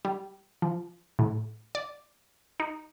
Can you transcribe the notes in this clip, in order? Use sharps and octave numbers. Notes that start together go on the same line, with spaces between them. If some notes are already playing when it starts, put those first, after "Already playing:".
G3
F3
A2
D5
D#4